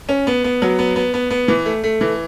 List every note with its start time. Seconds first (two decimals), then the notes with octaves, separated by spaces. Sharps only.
0.09 C#4
0.27 B3
0.44 B3
0.62 F#3
0.79 B3
0.96 B3
1.14 B3
1.30 B3
1.48 E3
1.66 A3
1.84 A3
2.01 E3